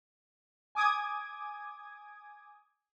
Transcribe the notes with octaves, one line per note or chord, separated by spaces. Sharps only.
G#5 D6 D#6 G#6